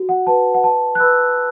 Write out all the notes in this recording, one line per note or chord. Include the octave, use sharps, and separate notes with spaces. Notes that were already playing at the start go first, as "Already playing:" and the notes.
Already playing: F#4
F#5
B4 A5
F#5
B4 A5
F#6
B4 B5 E6